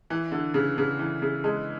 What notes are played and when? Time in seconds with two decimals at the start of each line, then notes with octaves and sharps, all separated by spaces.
0.10 E3
0.32 D3
0.54 C#3
0.78 C#3
0.99 E3
1.22 C#3
1.44 G#3